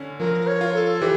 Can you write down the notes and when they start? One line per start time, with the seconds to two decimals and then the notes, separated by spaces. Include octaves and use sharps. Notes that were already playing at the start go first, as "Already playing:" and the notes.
Already playing: D3 C#4
0.19 F3 A#4
0.47 C#5
0.61 F4
0.74 A4
1.02 E3 G4